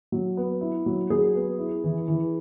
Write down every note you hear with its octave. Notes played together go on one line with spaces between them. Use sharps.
F#3
B3
E4
F#3
F#3 G#4
B3
E4
E3
E3